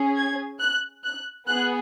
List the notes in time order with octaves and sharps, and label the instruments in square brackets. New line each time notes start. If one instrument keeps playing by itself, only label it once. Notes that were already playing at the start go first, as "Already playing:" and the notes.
Already playing: [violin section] C#4 G#4
G#6
F#6
F#6
B3 G#4 F#6